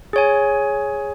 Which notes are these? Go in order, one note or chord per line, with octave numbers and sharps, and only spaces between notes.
G#4 C#5 G#5